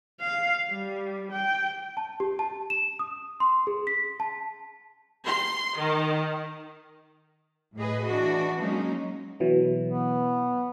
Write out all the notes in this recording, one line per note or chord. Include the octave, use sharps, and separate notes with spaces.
F5
G3
G5
A5
G4
A5
E7
D#6
C6
G#4
B6
A5
C6
D#3
A2 G#4 B4 D#5
E3 D4 F#4
F#3 G#3 A#3 C#4 D#4
B2 E3 F#3
B3